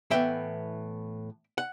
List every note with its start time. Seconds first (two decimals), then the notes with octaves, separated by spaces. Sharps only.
0.10 A2 E3 B3 E5 G5
1.58 F#5